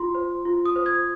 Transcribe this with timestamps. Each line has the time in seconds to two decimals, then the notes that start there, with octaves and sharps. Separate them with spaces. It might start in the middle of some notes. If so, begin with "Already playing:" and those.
Already playing: F4 C6
0.15 C5
0.45 F4
0.65 D#6
0.76 C5
0.86 G#6